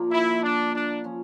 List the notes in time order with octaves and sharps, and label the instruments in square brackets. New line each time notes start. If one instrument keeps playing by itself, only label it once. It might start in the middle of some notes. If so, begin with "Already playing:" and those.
Already playing: [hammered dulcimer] A#2 F3 A#3
[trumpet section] E4
D4
D4
[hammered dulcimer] F3 C#4